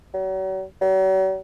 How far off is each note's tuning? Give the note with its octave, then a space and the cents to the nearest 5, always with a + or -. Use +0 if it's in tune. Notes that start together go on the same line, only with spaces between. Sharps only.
F#3 +40
F#3 +45